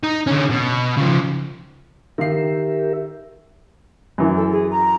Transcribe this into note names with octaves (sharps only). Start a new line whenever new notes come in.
D#4
D3 C#4
B2
C#3 F3
D#3 G4 A#4 E5 F5 C7
F#2 E3
A4
G#4
A#5